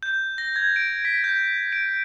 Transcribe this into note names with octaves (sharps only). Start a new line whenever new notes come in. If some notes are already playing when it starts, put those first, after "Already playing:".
G6
A#6
G#6
D7
B6
G6
D7